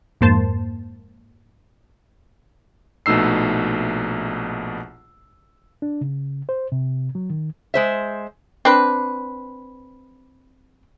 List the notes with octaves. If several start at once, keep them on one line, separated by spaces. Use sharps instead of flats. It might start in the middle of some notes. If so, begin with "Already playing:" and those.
F2 G#2 A#3 C5 A5 C6
A#1 B2 A3 D#4 E6 C7
D4
C#3
C5
C3
F#3
D#3
G#3 C5 E5
C4 D4 B4